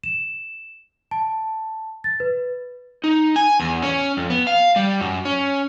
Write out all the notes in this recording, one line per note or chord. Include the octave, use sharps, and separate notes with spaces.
E7
A5
A6
B4
D#4
G#5
E2
C#4
F2
B3
F5
G3
F#2
C#4